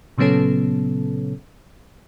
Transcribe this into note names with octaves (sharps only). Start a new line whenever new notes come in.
A#2 C#3 F#3 B3 C#4 A4